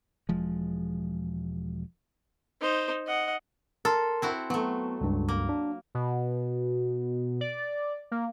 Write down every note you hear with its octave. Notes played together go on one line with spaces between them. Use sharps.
E1 F3 G#3
D#4 C5
D#5 F#5
A4 A#4 A5 C6
C4 E4 F#4
F#3 A3 B3
C#2 G2
A#3
D4
B2
D5
A#3